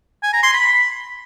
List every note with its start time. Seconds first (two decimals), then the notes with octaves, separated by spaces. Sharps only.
0.23 G#5
0.33 A#5
0.43 C6
0.53 B5